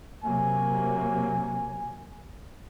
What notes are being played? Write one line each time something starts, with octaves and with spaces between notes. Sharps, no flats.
C3 F#3 A#3 G#5